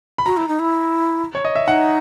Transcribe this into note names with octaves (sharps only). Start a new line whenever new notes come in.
B5
F#4 A#5
E4
D#4
E4
C#5
D#5
E5
D#4 F#5